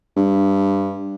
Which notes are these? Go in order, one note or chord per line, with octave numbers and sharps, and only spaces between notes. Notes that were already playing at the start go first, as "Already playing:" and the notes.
G2